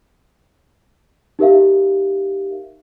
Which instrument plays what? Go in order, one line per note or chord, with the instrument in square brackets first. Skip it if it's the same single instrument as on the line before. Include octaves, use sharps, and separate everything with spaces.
[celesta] D#4 G4 A#4 E5 F5